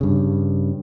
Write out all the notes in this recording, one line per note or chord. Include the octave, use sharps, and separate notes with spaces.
G2 C#3